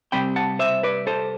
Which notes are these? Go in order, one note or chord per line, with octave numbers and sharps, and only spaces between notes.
C3 G3 C4 G5 B5
F#5 A5
C5 E5
B4 D5
A4 C5